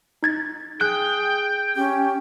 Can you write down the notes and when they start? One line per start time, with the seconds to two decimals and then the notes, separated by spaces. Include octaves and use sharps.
0.23 D#4 G#6 A6
0.81 G#4 G5 F#6
1.76 C#4 G4